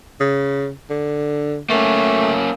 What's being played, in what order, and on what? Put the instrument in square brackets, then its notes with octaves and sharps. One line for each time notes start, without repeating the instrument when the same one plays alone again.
[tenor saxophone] C#3
D3
[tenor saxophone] A3 [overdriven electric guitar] A#3 C#4